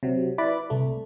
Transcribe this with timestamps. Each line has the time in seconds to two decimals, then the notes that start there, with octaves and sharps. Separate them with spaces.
0.03 C3 F#3
0.38 E4 B4 D5 B5 D6
0.70 C2 A3